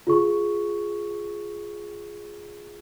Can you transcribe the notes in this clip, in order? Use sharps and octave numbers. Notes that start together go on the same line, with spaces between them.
F4 G#4 C#6